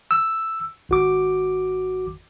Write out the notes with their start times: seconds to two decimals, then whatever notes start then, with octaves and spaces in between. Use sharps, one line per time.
0.11 E6
0.89 G#1 F#4 D6